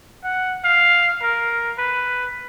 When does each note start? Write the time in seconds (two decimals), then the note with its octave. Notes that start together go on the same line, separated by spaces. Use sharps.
0.24 F#5
0.64 F5
1.22 A#4
1.78 B4